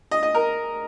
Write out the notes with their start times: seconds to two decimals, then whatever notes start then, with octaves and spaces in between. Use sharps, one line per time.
0.11 D#5
0.23 D#5
0.35 A#4